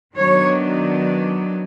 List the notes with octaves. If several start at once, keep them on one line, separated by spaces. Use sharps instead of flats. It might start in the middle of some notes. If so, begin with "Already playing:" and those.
D#3 F#3 B3 D4 C#5